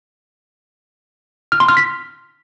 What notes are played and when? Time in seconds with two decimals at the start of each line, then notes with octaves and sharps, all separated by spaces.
1.52 F6
1.60 C6
1.68 F6
1.77 B6